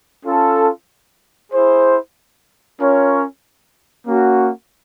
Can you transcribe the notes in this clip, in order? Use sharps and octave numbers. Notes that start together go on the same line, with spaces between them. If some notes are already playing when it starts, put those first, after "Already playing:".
C#4 F4 A4
E4 G#4 C5
C#4 F4 A#4 C#5
A#3 C#4 F#4